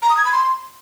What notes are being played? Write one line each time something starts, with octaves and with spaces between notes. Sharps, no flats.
A#5
D#6
G#6
B5
C6